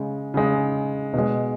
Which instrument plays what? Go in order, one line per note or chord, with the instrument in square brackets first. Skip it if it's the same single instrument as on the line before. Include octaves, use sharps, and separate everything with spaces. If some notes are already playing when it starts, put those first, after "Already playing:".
Already playing: [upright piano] C#3 G#3
C#3 G#3
B2 G#3